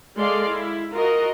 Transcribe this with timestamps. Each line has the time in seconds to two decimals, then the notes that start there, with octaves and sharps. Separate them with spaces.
0.18 G#3 A4 D5 F5 C6
0.48 E4
0.93 F4 F#4 A#4 D#5